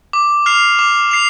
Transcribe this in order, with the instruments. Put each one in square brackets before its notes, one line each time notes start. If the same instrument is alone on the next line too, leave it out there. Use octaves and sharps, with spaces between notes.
[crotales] D6
F6 C7 F7
D6
C7 F7